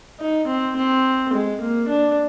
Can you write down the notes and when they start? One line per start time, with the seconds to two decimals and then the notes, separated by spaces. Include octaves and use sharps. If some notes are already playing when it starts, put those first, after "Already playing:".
0.20 D#4
0.48 C4
0.76 C4
1.33 G#3
1.61 A#3
1.88 D4